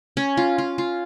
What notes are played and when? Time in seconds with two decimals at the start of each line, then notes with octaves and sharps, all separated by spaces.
0.17 C#4
0.37 F4
0.58 F4
0.78 F4